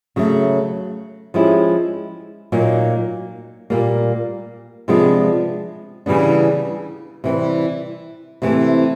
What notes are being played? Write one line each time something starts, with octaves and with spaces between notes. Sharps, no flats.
C#3 F#3 A3
F3 G#3 C#4 E4 G4
A#2 F#3 A#3 D#4
A#2 G3 A#3
C3 F3 G#3 B3 D4
C#3 E3 G3 B3 D4
C3 E3 G3 C4
C3 E3 A3 C4